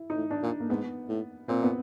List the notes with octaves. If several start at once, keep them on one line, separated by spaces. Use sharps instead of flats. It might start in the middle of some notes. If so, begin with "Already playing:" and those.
Already playing: E4
D#4
A2
D4
A#2
A#3
G#2 B3
A2
A#2 C4
B3